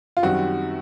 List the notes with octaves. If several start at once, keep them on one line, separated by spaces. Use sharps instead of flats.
F4
F#2 D#3 G3 C4 F#4